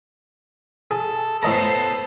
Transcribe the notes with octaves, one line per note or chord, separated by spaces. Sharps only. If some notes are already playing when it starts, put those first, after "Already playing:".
G#4 A4
A2 B3 A4 C5 D#5 A#5 C7